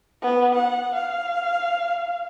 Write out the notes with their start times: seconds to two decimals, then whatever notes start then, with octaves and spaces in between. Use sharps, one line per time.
0.22 B3
0.55 F#5
0.95 F5